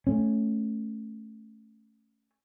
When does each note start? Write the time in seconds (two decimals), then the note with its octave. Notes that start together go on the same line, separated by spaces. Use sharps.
0.07 A3 C#4